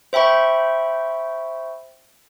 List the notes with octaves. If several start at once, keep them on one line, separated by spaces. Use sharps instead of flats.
C5 E5 G5 B5 C#6